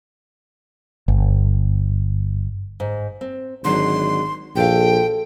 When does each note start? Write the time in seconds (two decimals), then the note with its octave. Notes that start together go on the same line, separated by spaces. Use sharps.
1.08 G1
2.80 G#2
3.21 C4
3.65 G#1 D3 F#3 G#3 C6
4.56 A#1 F#4 A4 F5 G5